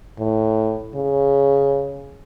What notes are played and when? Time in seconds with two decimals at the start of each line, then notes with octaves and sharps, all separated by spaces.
0.19 A2
0.95 C#3